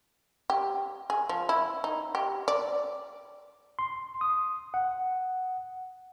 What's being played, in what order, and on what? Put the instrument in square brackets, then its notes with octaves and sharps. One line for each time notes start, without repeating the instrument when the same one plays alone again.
[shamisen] G4
G#4
F3
E4
D#4
G4
D5
[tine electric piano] C6
D#6
F#5